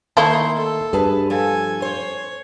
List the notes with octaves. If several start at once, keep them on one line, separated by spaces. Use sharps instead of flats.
D#3 A3 A#3 D#4 E4 C6
A4
G2 G#4 B4 A5
F3 A4 G#5
C5 C#5